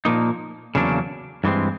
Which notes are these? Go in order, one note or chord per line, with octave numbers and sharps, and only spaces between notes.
A#2 F3 A#3 D#4
E2 C#3 F#3 A#3 D4
G2 E3 G#3 C4